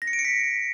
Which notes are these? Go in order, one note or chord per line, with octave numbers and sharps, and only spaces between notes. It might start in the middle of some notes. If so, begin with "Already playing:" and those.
A#6
C#7
D7
C#7
B6